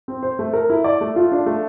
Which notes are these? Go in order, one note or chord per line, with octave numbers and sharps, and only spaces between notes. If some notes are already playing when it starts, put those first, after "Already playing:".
C4
C5
A3
A#4
E4
D5
A3
F4
D4
A3